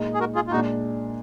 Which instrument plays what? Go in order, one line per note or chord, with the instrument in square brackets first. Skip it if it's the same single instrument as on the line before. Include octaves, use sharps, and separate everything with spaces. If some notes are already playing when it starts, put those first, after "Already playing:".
Already playing: [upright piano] A#2 G#3 D#4
[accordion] G#4
F#4 A#4
F4 G#4
F4
[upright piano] A#2 G#3 D4 [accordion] D#4 F#4